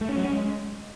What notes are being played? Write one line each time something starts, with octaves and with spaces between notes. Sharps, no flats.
A3
C#4
F#3
C#4
G#3